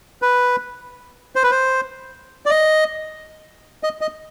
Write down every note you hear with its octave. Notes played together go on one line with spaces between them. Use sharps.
B4
C5
B4
C5
D5
D#5
D#5
D#5